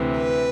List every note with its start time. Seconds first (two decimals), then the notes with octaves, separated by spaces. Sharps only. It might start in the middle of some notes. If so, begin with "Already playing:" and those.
Already playing: D2 C3 E3
0.17 B4